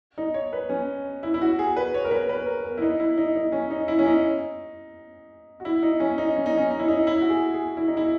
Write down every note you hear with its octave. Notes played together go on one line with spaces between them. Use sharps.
D#4
C#5
B4
C#4
E4
E4
F#4
G#4
B4
C#5
A#4
B4
B4
A#4
A#4
E4
D#4
E4
D#4
D#4
C#4
D#4
E4
C#4
D#4
F#4
E4
D#4
C#4
D#4
C#4
D#4
C#4
D#4
E4
D#4
E4
F#4
G#4
G#4
E4
D#4
E4